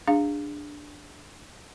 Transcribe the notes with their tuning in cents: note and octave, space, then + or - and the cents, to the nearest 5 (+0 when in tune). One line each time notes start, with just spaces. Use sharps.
D4 +0 G#4 -25 F5 +0